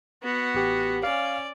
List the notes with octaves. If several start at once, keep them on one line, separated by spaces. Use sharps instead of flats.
B3 F#4
A1 G4
C#4 D5 F5